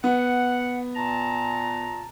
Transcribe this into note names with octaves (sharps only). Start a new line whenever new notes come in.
B3 F#5
A#2 A5 A#5